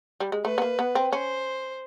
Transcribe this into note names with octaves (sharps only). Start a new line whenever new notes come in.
G3
G#3
A3 B4
B3
A#3
B3
C4
C#4 C5